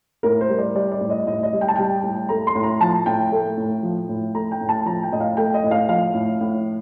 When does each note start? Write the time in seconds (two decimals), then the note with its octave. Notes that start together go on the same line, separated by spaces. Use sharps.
0.23 A2 A#4
0.41 C5
0.49 G3
0.59 D5
0.75 G3 D5
0.92 D5
1.01 A2
1.10 D#5
1.27 A2 D#5
1.43 D#5
1.53 G3
1.61 G5
1.68 A5
1.76 G3 G5
2.03 A2
2.29 A3 A#5
2.47 C6
2.55 A2
2.63 A#5
2.80 F3 A5
3.06 A2 G5
3.32 A3
3.57 A2
3.83 F3
4.09 A2
4.34 A3 A#5
4.52 G5
4.61 A2
4.69 A5
4.86 F3 A#5
5.03 G5
5.12 A2 D#5
5.20 F5
5.37 A3 G5
5.54 D#5
5.64 A2
5.71 F5
5.89 F3 F5
6.14 A2
6.41 A2